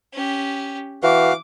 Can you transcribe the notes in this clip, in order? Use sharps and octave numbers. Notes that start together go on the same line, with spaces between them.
C#4 G4
E3 F#4 F5 D6